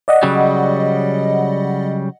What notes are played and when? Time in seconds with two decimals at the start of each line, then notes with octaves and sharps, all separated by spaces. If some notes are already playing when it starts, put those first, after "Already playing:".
0.08 D5 D#5 F#5
0.23 C#3 F#3 G3